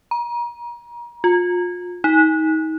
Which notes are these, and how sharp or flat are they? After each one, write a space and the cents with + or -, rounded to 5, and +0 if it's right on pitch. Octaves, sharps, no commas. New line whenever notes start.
A#5 +35
F4 +30
D#4 +30